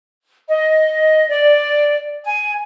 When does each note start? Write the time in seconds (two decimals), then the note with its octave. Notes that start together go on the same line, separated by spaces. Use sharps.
0.48 D#5
1.29 D5
2.24 G#5